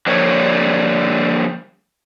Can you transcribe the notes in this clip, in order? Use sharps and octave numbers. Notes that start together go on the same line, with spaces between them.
D3 F3 G3 A#3 C#5